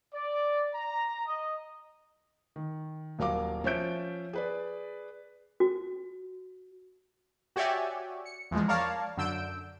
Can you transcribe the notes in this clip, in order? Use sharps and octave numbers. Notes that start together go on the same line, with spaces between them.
D5
A#5
D#5
D#3
D#1 F#3 A#4 F5 D6
F3 C#4 F4 E5 G6 D7
G#4 B4 D5
F#4
F#4 G4 C#5 D5 E5 G#5
C#7
E2 F3 G#3
A#4 C#5 D5 F5 A5
F#2 D3 E6 G6 D7